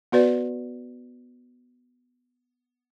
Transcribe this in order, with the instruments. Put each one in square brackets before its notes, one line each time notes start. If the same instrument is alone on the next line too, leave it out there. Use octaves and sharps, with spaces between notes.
[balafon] B3 F#4 B4 D5